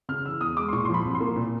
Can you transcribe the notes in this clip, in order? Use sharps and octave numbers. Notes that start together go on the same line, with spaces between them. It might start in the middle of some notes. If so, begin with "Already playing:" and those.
C#3 F6
E3 E6
E2 D#6
G#3 D6
C6
A#2 C#6
C6
F3
B5
C2
C6
A#3
A#2